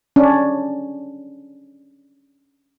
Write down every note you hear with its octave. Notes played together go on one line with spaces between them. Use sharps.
C#4 D4